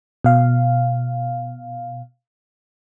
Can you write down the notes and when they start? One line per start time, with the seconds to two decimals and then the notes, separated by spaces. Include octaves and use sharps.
0.24 B2 F5